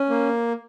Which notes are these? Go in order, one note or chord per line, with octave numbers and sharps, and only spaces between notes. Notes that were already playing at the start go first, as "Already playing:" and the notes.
Already playing: C#4
A#3